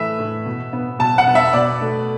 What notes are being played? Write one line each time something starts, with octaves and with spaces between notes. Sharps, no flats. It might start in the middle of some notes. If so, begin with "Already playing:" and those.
Already playing: A2 E3 A3 B4 E5
A2
B2
B3
B2 A5
F#5
B3
E5
B2 D5
A3